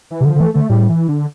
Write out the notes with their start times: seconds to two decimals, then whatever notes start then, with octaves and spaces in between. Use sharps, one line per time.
0.11 E3
0.21 C3
0.25 D3 F3
0.35 D3
0.40 E3 A3
0.54 D3 A3
0.69 A2 G3
0.89 E3
1.09 D3